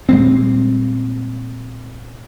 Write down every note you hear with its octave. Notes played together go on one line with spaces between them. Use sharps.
A#2 G3 G#3 C4